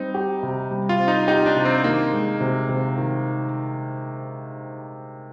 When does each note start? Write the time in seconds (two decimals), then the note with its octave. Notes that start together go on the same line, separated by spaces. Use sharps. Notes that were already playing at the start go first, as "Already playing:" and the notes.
Already playing: G3 C4 D#4
0.14 G4
0.43 C3
0.71 G3
0.89 F4
0.99 C4
1.08 D#4
1.28 D#4 G4
1.46 D4
1.56 C3
1.65 C4
1.84 D#3 A#3
2.13 G#3
2.40 C3
2.69 C3
2.98 D#3